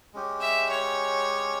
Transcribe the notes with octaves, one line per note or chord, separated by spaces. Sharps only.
G#3 C#4 G4
E5
C#5